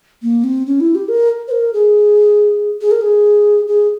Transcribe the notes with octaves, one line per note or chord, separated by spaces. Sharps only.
A#3
C4
C#4
E4
G4
A#4
C5
A#4
G#4
G#4
A#4
G#4
G#4